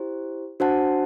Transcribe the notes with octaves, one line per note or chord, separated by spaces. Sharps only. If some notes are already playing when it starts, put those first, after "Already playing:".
Already playing: E4 G4 C5
D4 F#4 C5 F#5 A5